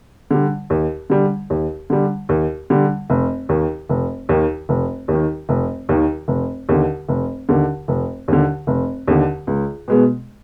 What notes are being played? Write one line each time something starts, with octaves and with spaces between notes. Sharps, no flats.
D3 G3
D#2
D3 G3
D#2
D3 G3
D#2
D3 G3
F1
D#2 D#3
F1
D#2 D#3
F1
D#2
D#3
F1
D#2 D#3
F1
D#2 D3
F1
D#2 D3
F1
D#2 D3
F1
D#2 D3
C#2
B2 G#3 B3